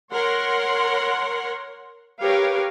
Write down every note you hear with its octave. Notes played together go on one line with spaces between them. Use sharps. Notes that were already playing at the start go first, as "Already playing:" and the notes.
A#4 C#5 F#5 C6
G4 A#4 B4 C#5 F5